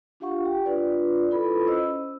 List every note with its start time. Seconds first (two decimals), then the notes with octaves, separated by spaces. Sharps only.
0.20 D4 F4 G4 F5 F#5 C#6
0.45 G4 G5
0.66 D4 F4 B4 D5
1.31 E4 F4 A4 B4 B5
1.68 C#4 C5 D#5 E6